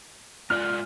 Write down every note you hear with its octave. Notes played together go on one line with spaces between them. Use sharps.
G#2 F4 D5 F6 F#6